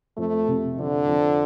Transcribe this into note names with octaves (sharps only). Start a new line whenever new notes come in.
F2 A3
C3
F2 D3
F2